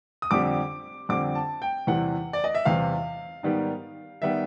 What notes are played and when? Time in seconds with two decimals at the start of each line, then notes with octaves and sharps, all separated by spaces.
0.22 D#6
0.31 F2 D3 G3 C4 D6
1.09 F2 D3 G3 C4 D6
1.35 A5
1.62 G5
1.87 E2 C3 E3 G3 F#5
2.33 D5
2.44 D#5
2.55 E5
2.65 E2 C3 E3 G3 F5
3.43 G#2 D#3 G3 B3
4.22 D#3 G3 B3 E5